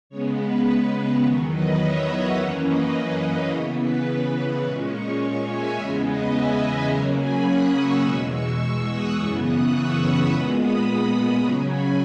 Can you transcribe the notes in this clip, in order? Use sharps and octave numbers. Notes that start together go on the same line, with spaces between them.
C#3 G#3 B3 C#5
B4
E2 D#3 F#3 C#5
B4 D#5
C#5 E5
D#5 F#5
F#2 E3 A#3 C#4 C#5
B4 D#5
C#3 E3 B3 C#5
B4
A#2 G#3 C#4 C#5
C#5
C#5
E5 G#5
E2 C#3 G#3 B3 C#5 E5
B4 D#5
E5 G#5
E5 G#5
C#3 F#3 A#3 C#4 F#5 A#5
G#5 B5
D#6 F#6
C#6 E6
E2 B2 G#3 C#6 E6
C#6 E6
C#6 E6
D#6 F#6
F#2 C#3 E3 B3 C#6 E6
D#6 F#6
C#6 E6
B5 D#6
A#2 G#3 B3 B5 D#6
B5 D#6
C#3 F#3 C#4 A#5 C#6
G#5 B5